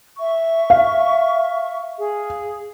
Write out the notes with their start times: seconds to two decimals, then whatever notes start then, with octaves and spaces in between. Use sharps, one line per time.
0.18 E5 C#6
0.70 F5
1.99 G#4